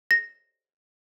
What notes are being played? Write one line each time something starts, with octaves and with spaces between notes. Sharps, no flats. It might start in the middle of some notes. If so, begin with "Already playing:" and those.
A#6